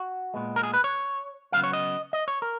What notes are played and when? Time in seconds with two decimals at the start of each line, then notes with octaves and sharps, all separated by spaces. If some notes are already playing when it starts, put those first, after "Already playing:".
Already playing: F#4
0.34 A#2 G#3 B3
0.56 A#4
0.63 G#4
0.74 B4
0.84 C#5
1.52 C#3 F#3 B3 F5
1.64 C#5
1.73 D#5
2.13 D#5
2.28 C#5
2.42 A#4